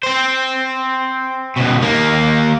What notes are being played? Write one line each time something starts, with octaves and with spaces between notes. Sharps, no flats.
C4 C5
C#2 B2
D#2 A#3